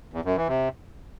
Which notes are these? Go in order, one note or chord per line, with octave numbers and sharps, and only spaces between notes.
E2
F#2
E3
C3